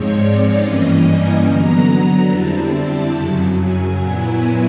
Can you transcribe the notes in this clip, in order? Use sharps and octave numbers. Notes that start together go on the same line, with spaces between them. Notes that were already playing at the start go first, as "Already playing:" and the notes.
Already playing: G#2 F3 G#3 C4 C#5
D5
G2 E3 G3 A#3 C#4 D#5
G#5
D3 F#3 B3 A#5
F2 D3 G3 C4 E4 A5
F#2 C#3 F#3
G#5
A#2 F#3 B3 E4